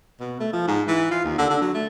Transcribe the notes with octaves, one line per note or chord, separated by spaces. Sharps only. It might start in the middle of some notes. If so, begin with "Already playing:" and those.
B2
A3
F3
G#2
E3
F4
D#2
D3
D3
F#3
A3